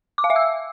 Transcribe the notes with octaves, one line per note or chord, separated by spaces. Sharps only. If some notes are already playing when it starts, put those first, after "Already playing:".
D6
F5
E5
E6